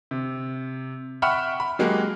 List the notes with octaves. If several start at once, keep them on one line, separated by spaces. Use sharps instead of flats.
C3
E5 F#5 G5 B5 C#6 F6
B5
F#3 G#3 A#3 F#4 G4